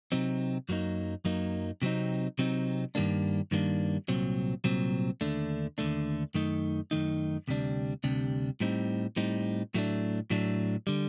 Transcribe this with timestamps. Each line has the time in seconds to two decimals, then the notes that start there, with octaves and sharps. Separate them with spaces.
0.12 C3 F#3 C4 D#4
0.69 F#2 F#3 A#3 D#4
1.25 F#2 F#3 A#3 D#4
1.82 C3 F#3 C4 D#4
2.39 C3 F#3 C4 D#4
2.95 G2 D#3 G3 A#3 D4
3.51 G2 D#3 G3 A#3 D4
4.08 C2 A#2 F#3 C4
4.64 C2 A#2 F#3 C4
5.21 D#2 D3 A3 D4
5.78 D#2 D3 A3 D4
6.34 F#2 D#3 A3 D#4
6.91 F#2 D#3 A3 D#4
7.48 D2 C3 G3 D4
8.04 D2 C3 G3 D4
8.60 A2 G3 C4 D#4
9.16 A2 G3 C4 D#4
9.74 A2 F#3 A3 D4
10.30 A2 F#3 A3 D4
10.87 D3 G3